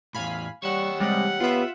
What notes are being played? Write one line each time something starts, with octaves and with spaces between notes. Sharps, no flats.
E2 A2 F5 G#5 B5
G3 G4 C#5 F#5 C#6 E7
C3 G3 G#3 F#5
B3 F4 E5